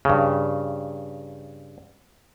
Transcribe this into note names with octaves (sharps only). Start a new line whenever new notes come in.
G2 C#3